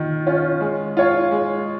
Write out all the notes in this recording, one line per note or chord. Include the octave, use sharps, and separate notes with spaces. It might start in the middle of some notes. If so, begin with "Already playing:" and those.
Already playing: D#3 F4
C#4 F4
G#3
F4 C#5 F5
G#3